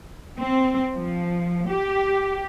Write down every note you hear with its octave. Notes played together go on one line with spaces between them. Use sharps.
C4
F3
G4